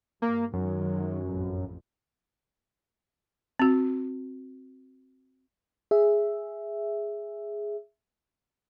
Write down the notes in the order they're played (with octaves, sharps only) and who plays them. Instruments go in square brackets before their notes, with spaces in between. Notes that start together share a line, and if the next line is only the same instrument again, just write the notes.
[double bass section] G2 [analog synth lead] A#3
[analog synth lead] F#2 [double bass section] D#3 F#3 G#3
[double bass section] A1 F2
[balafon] C4 F#4
[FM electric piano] G#4 E5